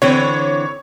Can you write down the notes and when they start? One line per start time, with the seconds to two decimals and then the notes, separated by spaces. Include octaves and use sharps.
0.02 D3 E3 C4 C#5